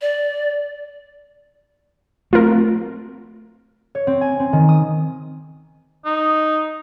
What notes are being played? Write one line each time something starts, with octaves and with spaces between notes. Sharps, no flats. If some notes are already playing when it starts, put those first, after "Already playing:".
D5
A3 A#3 C4 F4 A#4
C#5
C4
G#5
C4
D#3
D#6
D#4